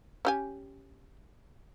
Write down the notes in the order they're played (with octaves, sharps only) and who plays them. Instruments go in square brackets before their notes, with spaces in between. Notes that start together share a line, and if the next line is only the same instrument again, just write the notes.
[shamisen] C#4 G4 G#5